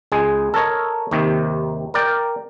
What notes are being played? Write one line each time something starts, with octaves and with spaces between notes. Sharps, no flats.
C#2 G#3 G#4
A4 A#4 C#5 D#5
D#2 C3 D#3
A#4 D5 G5